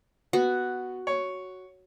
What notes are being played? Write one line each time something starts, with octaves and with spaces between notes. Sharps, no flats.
B3 F#4
C#5